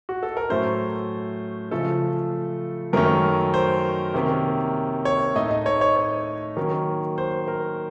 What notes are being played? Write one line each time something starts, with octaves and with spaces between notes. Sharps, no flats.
F#4
A4
A#4
A2 F#3 A3 C#4 C5
C#3 F3 A3 A4
F#2 D#3 A3 C#4 A#4
C5
C3 D#3 A#3 C#4
C#5
A2 A3 D#4 D#5
D#5
C#5
C#5
C#5
D#3 F#3 A#3 C#4
C5
A#4